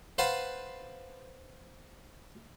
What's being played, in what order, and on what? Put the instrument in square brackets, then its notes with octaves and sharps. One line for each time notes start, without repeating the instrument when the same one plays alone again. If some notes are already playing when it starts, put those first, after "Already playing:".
[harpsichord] B4 C5 F5 F#5 A5